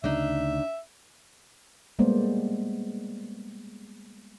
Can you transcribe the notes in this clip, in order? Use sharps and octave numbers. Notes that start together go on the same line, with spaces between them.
D2 C#3 D4 D#4 E5
G3 G#3 A#3 B3 C5 D5